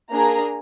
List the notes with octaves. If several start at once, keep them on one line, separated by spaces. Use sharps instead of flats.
A#3 D4 G#4 A#5